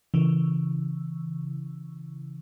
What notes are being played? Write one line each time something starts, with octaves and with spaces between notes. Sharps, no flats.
C#3 E3